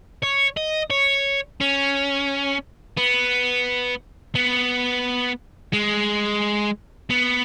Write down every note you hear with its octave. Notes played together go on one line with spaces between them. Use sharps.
C#5
D#5
C#5
C#4
B3
B3
G#3
B3